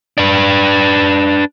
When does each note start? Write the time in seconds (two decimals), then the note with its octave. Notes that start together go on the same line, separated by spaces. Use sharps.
0.18 D4 B4